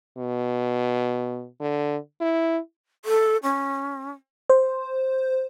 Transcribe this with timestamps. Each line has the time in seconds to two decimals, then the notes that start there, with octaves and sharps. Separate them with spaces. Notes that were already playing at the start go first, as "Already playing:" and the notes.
0.18 B2
1.60 D3
2.21 E4
3.05 A4
3.43 C#4
4.50 C5